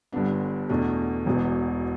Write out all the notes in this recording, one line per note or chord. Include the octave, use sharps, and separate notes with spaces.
G1 G2 D3 B3 D4
E2 B2 A3 D4
E1 E2 B2